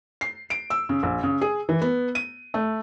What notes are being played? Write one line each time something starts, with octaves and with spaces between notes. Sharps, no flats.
C7
D7
E6
C#3
A#1
C#3
G#4
E3
B3
D#7
A3